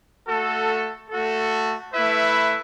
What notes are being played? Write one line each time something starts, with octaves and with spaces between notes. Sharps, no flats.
A3 F#4 A4
A3 F#4 A4
A3 E4 B4 E5